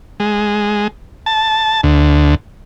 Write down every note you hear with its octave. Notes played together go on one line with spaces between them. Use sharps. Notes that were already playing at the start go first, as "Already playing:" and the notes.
G#3
A5
D2